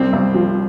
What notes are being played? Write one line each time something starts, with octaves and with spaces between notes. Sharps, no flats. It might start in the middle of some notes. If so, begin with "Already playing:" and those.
Already playing: C2 C4
C2
F3